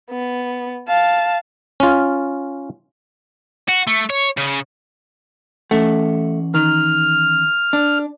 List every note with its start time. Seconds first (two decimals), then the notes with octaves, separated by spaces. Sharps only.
0.11 B3
0.89 F5 A5
1.80 C#4 F4
3.69 F#4
3.87 A3
4.10 C#5
4.37 C#3
5.71 E3 A3 C#4 F#5
6.55 D#3 F6
7.73 D4